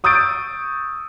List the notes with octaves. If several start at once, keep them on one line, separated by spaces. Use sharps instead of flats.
C#6 D#6 E6 G6 A6 D7